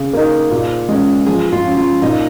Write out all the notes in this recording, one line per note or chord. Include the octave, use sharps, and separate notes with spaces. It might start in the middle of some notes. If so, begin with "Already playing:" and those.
Already playing: C#3 G#4
A#3 D#4
A#2
G#3 C#4
F3 G#4
F4
C#4
F4
A#2 D#4